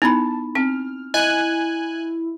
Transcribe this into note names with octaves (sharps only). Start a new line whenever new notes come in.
B3 D#4 E4 A5 B5
C4 G#5 F6
E4 D#5 G#5 F#6